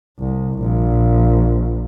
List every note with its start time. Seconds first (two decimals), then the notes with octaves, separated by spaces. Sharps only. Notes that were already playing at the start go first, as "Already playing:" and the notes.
0.20 C2
0.60 A#1